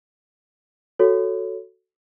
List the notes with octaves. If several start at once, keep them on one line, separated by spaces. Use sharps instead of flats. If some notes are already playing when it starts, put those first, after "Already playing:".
F#4 A4 C#5